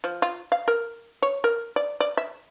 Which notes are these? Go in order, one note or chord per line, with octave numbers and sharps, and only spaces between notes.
F3
F4
F5
A#4
C#5
A#4
D5
D5
E5